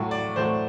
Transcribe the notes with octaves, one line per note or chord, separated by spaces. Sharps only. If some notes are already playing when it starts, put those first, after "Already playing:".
Already playing: A2 F#3 A3
D5
A2 F#3 A3 C5